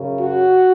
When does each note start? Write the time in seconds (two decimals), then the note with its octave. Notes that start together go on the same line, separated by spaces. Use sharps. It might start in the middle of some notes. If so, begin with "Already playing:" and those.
Already playing: F#2 C#3
0.20 F#4